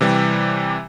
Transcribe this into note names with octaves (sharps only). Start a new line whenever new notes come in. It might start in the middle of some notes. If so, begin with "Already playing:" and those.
C3 E3 G3 G4